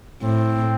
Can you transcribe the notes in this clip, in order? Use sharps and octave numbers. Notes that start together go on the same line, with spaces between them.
A2 C4